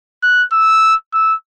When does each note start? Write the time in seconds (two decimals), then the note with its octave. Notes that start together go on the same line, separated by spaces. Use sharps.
0.23 F#6
0.53 E6
1.13 E6